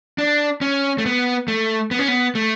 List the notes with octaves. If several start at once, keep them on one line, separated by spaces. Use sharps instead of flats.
D4
C#4
A3
B3
A3
B3
C#4
B3
A3